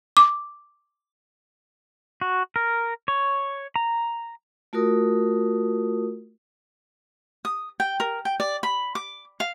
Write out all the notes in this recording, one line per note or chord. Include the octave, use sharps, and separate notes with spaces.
D6
F#4
A#4
C#5
A#5
A3 F4 F#4 A#4 D#6
D#6
G5
A#4
G5
D5
B5
D6
F5